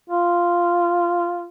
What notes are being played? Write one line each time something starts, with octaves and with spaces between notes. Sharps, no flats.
F4